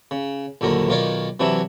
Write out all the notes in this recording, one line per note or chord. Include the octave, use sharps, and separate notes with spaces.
C#3
A#1 D#2 D3 F#3 A#4
B1 D#3 F4 A#4 C#5 D5
C3 E3 F#3 D4 E4